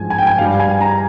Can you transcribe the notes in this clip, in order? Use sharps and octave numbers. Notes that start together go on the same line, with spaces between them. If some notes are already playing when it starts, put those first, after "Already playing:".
Already playing: G#2 F3 G#5
G#5
G5
G#5
G2 G3 F5
G#5
A#5